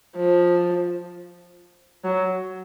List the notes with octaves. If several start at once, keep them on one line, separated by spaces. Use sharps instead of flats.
F3
F#3